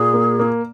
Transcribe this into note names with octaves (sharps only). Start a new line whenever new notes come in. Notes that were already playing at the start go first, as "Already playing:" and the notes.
Already playing: A#2 G#4
A#3
A#3